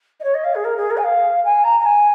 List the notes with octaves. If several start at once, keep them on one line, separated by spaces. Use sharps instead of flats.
D#5
C#5
D#5
F5
G#4
A#4
G#4
A#4
G#5
F5
G#5
A#5
A#5
G#5